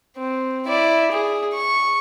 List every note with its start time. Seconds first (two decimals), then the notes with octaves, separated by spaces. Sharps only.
0.17 C4
0.68 E4 D5
1.12 G#4
1.54 C#6